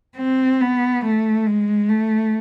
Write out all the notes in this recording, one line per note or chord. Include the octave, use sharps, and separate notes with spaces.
C4
B3
A3
G#3
A3